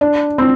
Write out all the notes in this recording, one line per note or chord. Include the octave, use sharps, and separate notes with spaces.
D4
C4